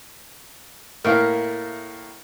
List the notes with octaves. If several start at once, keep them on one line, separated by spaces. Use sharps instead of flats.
A2 A#3 A#4 E5 F5